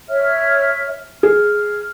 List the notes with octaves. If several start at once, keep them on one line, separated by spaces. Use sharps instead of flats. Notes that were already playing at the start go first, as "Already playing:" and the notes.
C#5 E5 F6
G#4 F6